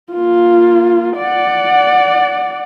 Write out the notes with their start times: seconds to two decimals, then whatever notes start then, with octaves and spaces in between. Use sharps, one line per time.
0.12 A#3 F4
1.18 D5 F#5